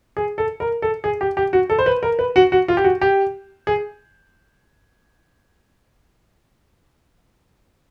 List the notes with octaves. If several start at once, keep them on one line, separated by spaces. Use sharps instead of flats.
G#4
A4
A#4
A4
G#4
G4
G4
F#4
A4
C5
B4
A#4
B4
F#4
F#4
F4
G4
F#4
G4
G#4